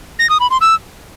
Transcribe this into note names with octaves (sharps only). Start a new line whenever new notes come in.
A#6
D#6
B5
C6
E6